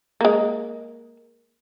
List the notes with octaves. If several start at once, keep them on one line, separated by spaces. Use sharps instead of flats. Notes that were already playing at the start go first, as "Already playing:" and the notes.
G#3 A#3